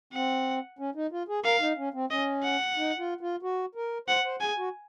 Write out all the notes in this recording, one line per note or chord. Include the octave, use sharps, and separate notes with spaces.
C4 F#5
C#4
D#4
F4
G#4
A#4 F5
D#4
C#4
C4
C#4 D#5
F#5
D#4
F4
F4
F#4
A#4
C5 F#5
C5
G#4 G#5
F#4